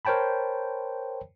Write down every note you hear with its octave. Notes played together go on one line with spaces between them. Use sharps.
A#4 C5 C#5 G5 A5 B5